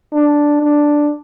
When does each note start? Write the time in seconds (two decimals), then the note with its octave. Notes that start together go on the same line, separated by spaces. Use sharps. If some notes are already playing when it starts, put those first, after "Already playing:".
0.13 D4
0.63 D4